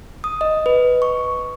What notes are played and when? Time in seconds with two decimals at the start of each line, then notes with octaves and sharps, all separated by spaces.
0.24 D#6
0.41 D#5
0.66 B4
1.02 C#6